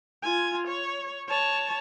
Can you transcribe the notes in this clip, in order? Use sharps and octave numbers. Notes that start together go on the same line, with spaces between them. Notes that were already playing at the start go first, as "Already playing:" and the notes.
F4 G#5
C#5
C#5 A5